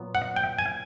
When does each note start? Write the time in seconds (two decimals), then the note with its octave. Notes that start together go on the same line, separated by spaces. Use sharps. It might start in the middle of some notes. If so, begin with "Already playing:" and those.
Already playing: A#2 F#3 B3
0.15 F#5
0.36 G5
0.59 G#5